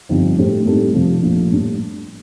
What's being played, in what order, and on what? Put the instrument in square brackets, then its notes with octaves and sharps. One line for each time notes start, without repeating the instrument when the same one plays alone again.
[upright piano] G1 G2 F3 C4 D#4
A2 A3 D4 G4 C5
A2 G3 C4 D#4 A4
F1 F2 C3 F3
A#1 A#2 F3 A3
A2 G3 D4